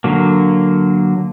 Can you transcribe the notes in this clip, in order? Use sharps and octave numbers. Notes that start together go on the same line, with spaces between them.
D3 F#3 A#3